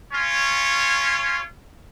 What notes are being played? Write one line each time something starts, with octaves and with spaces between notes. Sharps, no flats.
C#4 F4 C#5